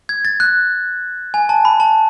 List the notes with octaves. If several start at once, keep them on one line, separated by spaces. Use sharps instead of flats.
G#6
A6
F#6
G#5
A5
B5
A5